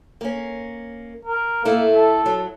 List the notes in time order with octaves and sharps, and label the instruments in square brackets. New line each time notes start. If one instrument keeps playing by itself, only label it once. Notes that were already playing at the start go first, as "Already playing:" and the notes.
[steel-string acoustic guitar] A#3 C#4
[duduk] A#4
[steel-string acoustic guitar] A2 A3 E4 [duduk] A#3
[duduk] A4
[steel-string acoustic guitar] F#3